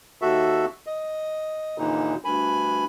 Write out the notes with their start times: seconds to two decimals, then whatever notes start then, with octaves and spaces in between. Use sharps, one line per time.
0.22 D#2 F#4 A4 E5
0.87 D#5
1.78 D#2 A#2 D3 E3 D#4
2.24 D2 G2 G#5 B5